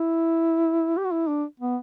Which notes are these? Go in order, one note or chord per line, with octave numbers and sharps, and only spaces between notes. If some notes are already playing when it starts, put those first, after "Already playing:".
Already playing: E4
G4
F#4
E4
D4
B3